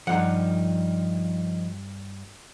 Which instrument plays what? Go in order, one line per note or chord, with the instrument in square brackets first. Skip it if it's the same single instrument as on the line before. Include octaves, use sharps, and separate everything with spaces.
[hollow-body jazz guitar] G2 F#5 [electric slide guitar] F3 D#4